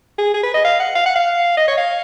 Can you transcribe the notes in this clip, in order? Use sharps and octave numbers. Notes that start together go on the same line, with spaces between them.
G#4
G#4
B4
D#5
F5
F#5
F5
F#5
F5
D#5
C#5
F5